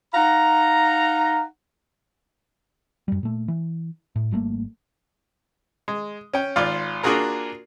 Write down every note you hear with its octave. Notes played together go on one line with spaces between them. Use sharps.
D#4 F5 F#5 A#5
F#2 G3
A#2 A3
E3
A2
G#1 G3 A3 A#3
G#3
C#4 G5
G#1 F4 D5 F5
A#3 D4 F4 F#4 G#4 A#4